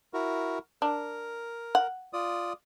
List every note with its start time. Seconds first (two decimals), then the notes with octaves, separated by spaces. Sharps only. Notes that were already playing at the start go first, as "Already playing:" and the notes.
0.14 E4 F#4 A#4
0.82 D4 A#4
1.75 F#5
2.13 F4 D5 D#6